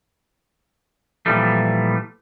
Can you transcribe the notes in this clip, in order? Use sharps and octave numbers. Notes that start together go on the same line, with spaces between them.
A#2 E3 F3 G3 A3